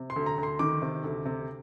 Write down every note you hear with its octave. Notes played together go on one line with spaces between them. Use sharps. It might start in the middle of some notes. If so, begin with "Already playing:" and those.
Already playing: C3
C6
D2
A#5
D2
C6
D#3 D6
C3
D2
C3